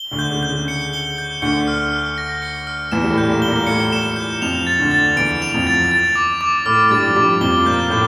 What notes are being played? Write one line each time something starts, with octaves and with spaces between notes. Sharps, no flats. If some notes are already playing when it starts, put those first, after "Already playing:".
Already playing: G7
D2 D3
G6
C#3
G6
C#3
C#7
G7
G6
D2 D3 C#7
F6
F6
A#6
C#7
F6
E2 E3 E7
G3
A2 A3
G6
A#2 A#3
G7
A#2 A#3
A2 A3 C#7
E7
G6
F2 F3 F7
A6
D2 D3
A6
E2 E3 D7
F7
F2 F3
A6
A6
D6
D6
A2 A3 F6
G2 G3 A6
F3
G2 G3 D6
F2 F3 G7
A#2 A#3 G6
A2 A3 G6